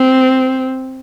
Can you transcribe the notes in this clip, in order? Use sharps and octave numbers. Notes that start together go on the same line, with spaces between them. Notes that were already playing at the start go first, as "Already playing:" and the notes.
Already playing: C4